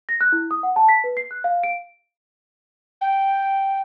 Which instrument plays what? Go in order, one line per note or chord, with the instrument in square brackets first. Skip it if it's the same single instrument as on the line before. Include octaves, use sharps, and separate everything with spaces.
[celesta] A#6
F#6
E4
D#6
F#5
A5
B6
B4
C7
F#6
F5
D7
[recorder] G5